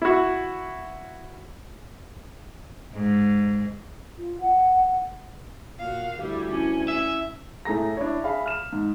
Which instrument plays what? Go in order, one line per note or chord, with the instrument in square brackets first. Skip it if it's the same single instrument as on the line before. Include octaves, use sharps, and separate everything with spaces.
[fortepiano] E4 F#4
[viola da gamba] G#2
[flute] F4
F#5
[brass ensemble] A#2 [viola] F#4 F5
[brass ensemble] D2 [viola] G3 E4
[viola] C#4 [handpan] E4
[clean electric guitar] E5
[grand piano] A2 A3 G#4 A#5 A#6
D4 E4 C#5
G#4 E5 F5 B5
F6 E7
G#2